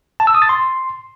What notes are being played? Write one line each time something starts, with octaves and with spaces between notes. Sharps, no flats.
A5
E6
D#6
A6
C6